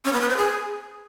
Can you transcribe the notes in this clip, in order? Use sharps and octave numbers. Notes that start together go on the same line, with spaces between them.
C#4
B3
B4
C5
G#4